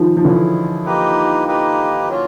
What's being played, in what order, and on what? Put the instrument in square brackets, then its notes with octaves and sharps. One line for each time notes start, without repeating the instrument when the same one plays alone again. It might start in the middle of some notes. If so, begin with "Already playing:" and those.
Already playing: [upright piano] D#3 F3
F3
[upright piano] D3 E3 [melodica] C#4 E4 G#4
[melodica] A#3 D#4 G4 B4
A#3 D#4 G4 B4
F#3 A#3 C#4 F4